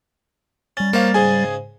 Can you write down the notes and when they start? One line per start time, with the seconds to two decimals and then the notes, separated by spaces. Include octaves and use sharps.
0.77 G3 C#4 A6
0.93 A#3 C5 C#5 F5
1.14 G#2 C#3 G#4 G#5